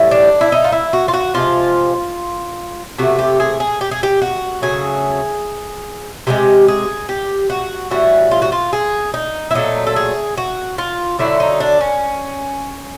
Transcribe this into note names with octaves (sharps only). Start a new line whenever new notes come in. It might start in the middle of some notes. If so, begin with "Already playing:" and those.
Already playing: A2 E3 G3
D4
E4
D#4
F4
E4
F#4
F4
F#4
C3 F3 G#3 F4
C3 E3 A3 F#4
G4
G#4
G#4
G4
G#4
G4
F#4
C#3 F#3 A3 G#4
C3 E3 G#3 G4
G#4
G4
F#4
A2 E3 G3 F#4
F4
F#4
F4
G#4
D#4
E4
A#2 F#3 A3 D#4
A4
G#4
F#4
F4
D3 F#3 A3 E4
D#4
D4
C#4